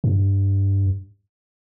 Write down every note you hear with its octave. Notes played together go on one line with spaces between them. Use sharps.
G2